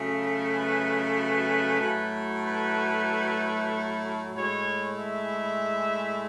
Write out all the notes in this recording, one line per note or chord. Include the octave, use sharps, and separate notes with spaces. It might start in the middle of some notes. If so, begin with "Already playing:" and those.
Already playing: C#3 F#3 A3
B4
B4
A2 F#3 A3
B4
A2 G#3 C#5
E5